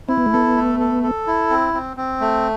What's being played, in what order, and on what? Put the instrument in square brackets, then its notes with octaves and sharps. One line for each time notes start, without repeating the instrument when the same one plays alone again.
[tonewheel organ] C4 [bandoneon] E4
[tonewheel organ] B3
A3
[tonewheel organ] B3 [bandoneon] A4
[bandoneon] A3
A4
A4
E4
C4
C4
C4
A3